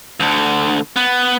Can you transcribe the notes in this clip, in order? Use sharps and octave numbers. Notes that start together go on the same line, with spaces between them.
D2 D3
B3